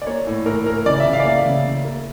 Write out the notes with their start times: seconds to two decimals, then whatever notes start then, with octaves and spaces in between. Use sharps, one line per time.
0.02 D5
0.06 A#3 C#5
0.27 A2
0.46 A2 A#4
0.66 A2 A#4
0.86 C#3 D5
1.00 E5
1.06 C#3
1.13 F5
1.20 D5
1.25 A#3 E5
1.46 C#3
1.65 C#3
1.85 A#3